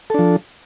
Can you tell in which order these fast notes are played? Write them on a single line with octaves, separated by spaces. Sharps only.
A4 D4 F3